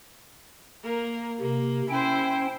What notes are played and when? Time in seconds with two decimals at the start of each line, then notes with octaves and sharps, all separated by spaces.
0.83 A#3 A#4
1.40 C3 A#3
1.89 C#4 E4 C5 G5